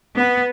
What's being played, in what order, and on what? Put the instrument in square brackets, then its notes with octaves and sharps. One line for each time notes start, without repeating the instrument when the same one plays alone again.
[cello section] B3